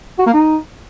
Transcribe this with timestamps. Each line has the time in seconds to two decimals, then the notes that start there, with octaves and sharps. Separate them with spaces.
0.19 F#4
0.26 A#3
0.34 D#4